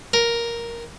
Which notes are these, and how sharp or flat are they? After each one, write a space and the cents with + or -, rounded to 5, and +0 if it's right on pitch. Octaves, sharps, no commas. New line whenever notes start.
A#4 +5